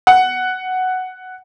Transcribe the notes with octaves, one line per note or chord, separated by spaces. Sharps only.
F#5